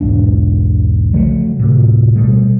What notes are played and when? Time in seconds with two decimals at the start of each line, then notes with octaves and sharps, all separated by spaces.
0.01 B1 E2 G#2 D4
1.13 C#3 F3 F#3 A3
1.59 D2 A2 C3
2.15 B2 G3 A3